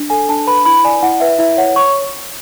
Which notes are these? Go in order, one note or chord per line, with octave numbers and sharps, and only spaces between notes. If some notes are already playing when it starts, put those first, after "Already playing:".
Already playing: D4
A4 G#5
D4 A5
B4 B5
E4 B5
D5 G#5
E4 F#5
B4 E5
E4 E5
C#5 F#5
C#5 C#6